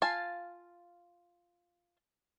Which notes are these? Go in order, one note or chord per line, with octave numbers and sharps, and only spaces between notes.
F4 F5 G#5 A5